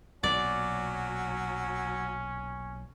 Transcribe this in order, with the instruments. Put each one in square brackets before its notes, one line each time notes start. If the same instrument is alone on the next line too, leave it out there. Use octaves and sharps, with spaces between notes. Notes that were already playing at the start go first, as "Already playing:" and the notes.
[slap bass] B1 A#2 [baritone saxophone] F#3 [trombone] C#4 [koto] D5